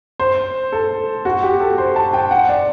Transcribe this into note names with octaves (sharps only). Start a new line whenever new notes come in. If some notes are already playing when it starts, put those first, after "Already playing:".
C5
A4
F#4
G4
A4
C5
A5
G5
F#5
D5